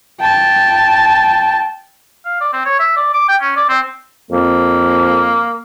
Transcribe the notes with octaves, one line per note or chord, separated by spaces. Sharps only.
G5 A5
F5
D5
C4
C#5
E5
D5
D6
G5
C#4
D5
C4
F2 A#3